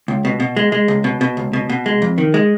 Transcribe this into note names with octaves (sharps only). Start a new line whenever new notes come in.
C#2
B2
B2
G#3
G#3
C#2
B2
B2
C#2
B2
B2
G#3
F2
D#3
G#3